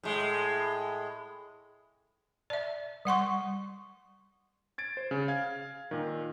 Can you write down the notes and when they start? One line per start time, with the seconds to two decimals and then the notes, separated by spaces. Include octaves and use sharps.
0.03 A2 G#3
2.50 D5 E5
3.05 G3 F#5 C6 C#6
4.78 G#6 A6 D7
4.97 C5
5.11 C#3
5.28 F5 G#6
5.91 A#2 D#3